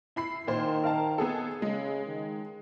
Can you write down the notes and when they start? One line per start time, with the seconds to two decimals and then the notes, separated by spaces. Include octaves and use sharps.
0.16 E4 B5 C7
0.47 A#2 D#3 C5
0.84 A#4 F5 A5
1.18 B3 G#4 A4
1.62 C#3 G#3
2.07 D#3